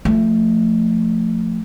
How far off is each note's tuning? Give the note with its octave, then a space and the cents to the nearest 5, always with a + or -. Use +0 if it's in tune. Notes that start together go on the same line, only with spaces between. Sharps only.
F3 +0 A3 +15